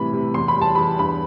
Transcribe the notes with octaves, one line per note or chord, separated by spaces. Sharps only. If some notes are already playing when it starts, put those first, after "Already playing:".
Already playing: A2 C3 E3 G3 B5
C3
E2 C6
B5
G3
A5
E2 B5
G2 B5